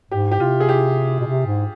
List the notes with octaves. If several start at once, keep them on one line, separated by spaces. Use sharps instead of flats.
G#2 G4
G4
C3 F4
G#4
G4
B2
C3
G#2